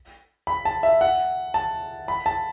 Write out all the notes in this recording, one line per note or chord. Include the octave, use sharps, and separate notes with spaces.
B5
A5
E5
F#5
A5
B5
A5